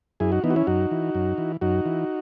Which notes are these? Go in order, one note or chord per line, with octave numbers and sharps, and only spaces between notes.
F#2 E4 G#4
D#4 F#4
E3 B3 D#4
F#4
C#4 E4
F#2 D#4 F#4
E3
F#2
E3
F#2 D#4 F#4
E3